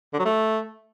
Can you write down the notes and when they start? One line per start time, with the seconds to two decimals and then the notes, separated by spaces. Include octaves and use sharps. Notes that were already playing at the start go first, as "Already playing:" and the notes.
0.13 D3
0.19 F#3
0.25 A3